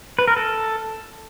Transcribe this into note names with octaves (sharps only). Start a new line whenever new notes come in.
B4
A#4
A4